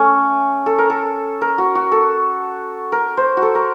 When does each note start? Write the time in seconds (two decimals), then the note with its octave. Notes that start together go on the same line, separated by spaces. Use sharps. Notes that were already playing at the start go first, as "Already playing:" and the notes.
Already playing: A3 C#4
0.66 A4
0.78 A#4
0.90 A4
1.41 A#4
1.58 F#4
1.75 F#4
1.92 A4
2.92 A#4
3.17 C5
3.37 F#4
3.42 A4
3.55 A#4